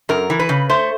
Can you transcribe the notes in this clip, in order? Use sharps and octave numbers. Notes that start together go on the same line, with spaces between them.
F#2 A#4
E3
B4
C#3
A3 C5